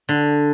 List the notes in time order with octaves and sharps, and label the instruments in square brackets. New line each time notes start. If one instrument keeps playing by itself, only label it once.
[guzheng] D3